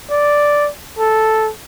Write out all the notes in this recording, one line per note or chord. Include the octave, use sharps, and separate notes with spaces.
D5
A4